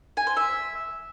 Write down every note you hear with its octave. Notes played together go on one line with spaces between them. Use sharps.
G#5
C5
E5